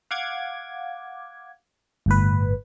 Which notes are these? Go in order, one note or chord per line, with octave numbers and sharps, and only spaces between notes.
F5 F#5 D6 G#6
G1 A2 B4